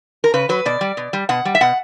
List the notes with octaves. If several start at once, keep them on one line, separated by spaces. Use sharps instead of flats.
A#4
C#3 B4
F#3 B4
B2 D5
G3
B2
G3
B2 F#5
G3
E5
B2 F#5